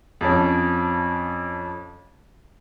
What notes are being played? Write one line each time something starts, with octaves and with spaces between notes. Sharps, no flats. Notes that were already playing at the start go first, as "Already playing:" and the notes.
F2 F3 C#4